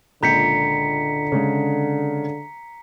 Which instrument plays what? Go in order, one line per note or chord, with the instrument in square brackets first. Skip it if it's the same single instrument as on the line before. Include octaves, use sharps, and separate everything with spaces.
[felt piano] C#2 A#2 G6 [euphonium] D3 [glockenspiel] A#5 B6 C#7
[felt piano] C#3 G#3